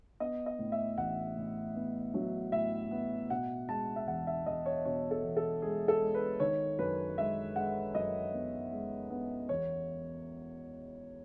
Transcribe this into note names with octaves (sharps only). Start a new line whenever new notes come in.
B3 D#5
D#5
A2
E5
A1 F#5
A2
B3
F#3
A2 E5
B3
B2 F#5
G#3 A5
E5
E2 F#5
E5
E2 D#5
C#5
B2 C#5
A4
E2
A4
G#3 G#4
A4
G#3
B4
D#3 C#5
F#2 B4
G#3 E5
G#3 F#5
F#2 D#5
B3
G#3
B3
E2 C#5